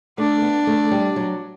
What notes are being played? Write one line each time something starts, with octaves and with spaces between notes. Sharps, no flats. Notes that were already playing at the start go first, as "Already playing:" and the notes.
A3 D4
B3
A3
G3
F#3